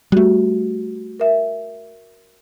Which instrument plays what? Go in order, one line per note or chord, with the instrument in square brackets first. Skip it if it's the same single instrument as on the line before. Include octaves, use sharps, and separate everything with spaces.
[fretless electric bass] G3 A3 [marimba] F#4 G4
[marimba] A#4 E5